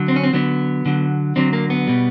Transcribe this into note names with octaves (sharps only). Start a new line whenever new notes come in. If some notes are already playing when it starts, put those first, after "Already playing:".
Already playing: D3 F#3
C4
C#4
C4
D3 F#3 B3
D3 F#3
D3 F#3 C4
A#3
B3
B2 G3